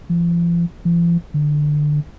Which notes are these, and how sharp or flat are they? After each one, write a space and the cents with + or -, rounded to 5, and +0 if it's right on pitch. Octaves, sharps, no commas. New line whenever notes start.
F3 -40
F3 -45
D3 +15